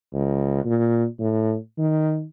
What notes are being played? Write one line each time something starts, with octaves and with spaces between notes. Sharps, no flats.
C#2
A#2
A2
D#3